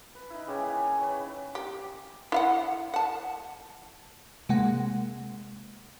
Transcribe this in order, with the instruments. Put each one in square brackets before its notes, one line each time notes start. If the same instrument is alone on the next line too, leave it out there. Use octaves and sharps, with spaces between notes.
[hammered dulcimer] B4
D#4 E4
C#3 G4 C#5 G#5
A#3
B4 C#5
[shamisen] G4
E4 F5 F#5
F#5 A5
[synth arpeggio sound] C3 G#3 A#3 F#5